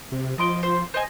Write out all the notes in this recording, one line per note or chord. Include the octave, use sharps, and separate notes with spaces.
C3
F3 D#5 C6 D6
C5
C5 D#5 G#5